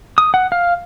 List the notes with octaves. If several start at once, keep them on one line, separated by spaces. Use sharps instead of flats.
D#6
F#5
F5